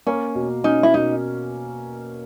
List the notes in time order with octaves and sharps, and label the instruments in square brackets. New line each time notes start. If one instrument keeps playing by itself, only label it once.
[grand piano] A#3 [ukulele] C#4
[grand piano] B2
[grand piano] C#4 [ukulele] D#4
[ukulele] E4
[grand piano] B2 [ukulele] D#4